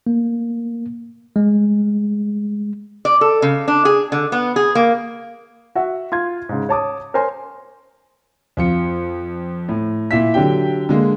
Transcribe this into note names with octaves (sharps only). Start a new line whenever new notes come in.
A#3
G#3
D5
A4
C#3
D4
G#4
D3
B3
G#4
A#3
F#4 E5 F#5
F4 C6 G#6
G#2 C#3
C#5 A5 D6 D#6
A#4 C5 C#5 G#5 C6
F2 F4 C#7
A2
A#2 E4 E5 B6
D3 F#3 G4 G5
D3 G#3 A#3